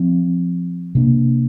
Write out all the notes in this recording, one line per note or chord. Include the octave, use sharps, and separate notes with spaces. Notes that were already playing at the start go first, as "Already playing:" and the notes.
Already playing: F3 C4
C3 A#3 D4